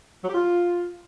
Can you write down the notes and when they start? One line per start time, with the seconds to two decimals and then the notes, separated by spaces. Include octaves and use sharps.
0.23 F#3
0.29 G4
0.34 F4